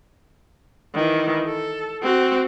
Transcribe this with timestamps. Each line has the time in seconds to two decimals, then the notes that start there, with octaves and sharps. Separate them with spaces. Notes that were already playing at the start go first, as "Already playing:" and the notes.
0.94 D#3 E3
1.45 A4
2.02 C4 F#4